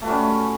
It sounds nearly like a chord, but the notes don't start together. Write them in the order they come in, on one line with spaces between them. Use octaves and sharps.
A3 F#4 G3 C#4